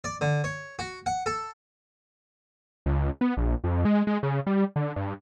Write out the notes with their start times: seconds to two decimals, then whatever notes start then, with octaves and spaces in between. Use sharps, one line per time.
0.04 D5
0.21 D3
0.44 C#5
0.79 F#4
1.06 F#5
1.26 A4
2.86 C#2
3.21 B3
3.37 A#1
3.64 F2
3.85 G#3
4.07 G#3
4.23 C#3
4.47 G3
4.76 D3
4.96 G2